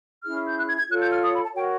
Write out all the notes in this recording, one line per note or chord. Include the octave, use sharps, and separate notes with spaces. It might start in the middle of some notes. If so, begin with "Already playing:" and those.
C#4 E4 G#4 F6
G6
F#6
G#6
G#6
F4 A4 C#5 F#6
G6
F6
D#6
B5
A5
F#4 A#4 C#5 G5